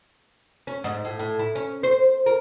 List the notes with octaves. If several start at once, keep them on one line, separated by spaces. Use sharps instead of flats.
C#4
G#2
A2
A2
E4
C#4
C5
A#4